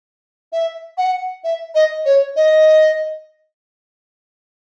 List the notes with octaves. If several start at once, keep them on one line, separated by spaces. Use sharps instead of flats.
E5
F#5
E5
D#5
C#5
D#5